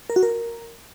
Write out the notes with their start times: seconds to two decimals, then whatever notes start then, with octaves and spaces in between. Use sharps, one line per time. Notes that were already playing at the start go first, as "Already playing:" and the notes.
0.10 A#4
0.16 F#4
0.23 A#4